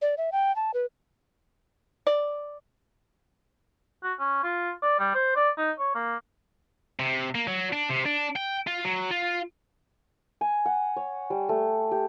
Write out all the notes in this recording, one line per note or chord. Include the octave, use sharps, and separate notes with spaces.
D5
E5
G5
A5
B4
D5
F#4
C#4
F4
D5
G3
C5
D5
D#4
C#5
A#3
C3
A#3
F#3
D4
C3
D4
G5
F4
F#3
F4
G#5
F#5
C#5
G3
A3
G4